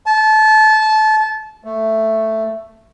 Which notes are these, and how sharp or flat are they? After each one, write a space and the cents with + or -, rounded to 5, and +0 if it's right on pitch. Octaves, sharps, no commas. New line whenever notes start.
A5 -25
A3 +5